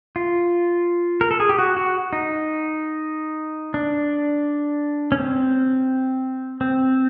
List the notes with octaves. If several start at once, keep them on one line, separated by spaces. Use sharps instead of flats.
F4
A#4
A4
G#4
G4
F#4
F#4
D#4
D4
C#4
C4
C4